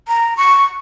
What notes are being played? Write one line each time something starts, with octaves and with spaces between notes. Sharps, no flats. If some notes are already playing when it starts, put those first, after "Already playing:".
A#5
C#6